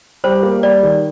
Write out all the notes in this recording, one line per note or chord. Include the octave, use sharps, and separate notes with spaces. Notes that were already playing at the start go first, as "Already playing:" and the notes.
G3 C5
A#3
G3 D5
D#3